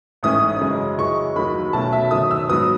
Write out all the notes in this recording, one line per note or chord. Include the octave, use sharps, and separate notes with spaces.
A1 G#2 E3 A3 C#4 D#6
F#2 C#3 G#3
F#2 E3 G#3 C#6
D#2 D#3 F#3 B5
B1 B2 A3 C#4 A5
E5
F#2 D#3 A3 D#6
E6
G#2 F#3 B3 D#6